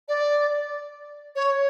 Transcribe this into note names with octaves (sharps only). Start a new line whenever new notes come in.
D5
C#5